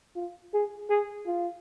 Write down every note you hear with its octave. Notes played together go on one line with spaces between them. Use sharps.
F4
G#4
G#4
F4